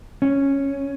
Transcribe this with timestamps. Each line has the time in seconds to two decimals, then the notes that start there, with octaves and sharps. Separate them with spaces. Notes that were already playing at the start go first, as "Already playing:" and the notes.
0.22 C#4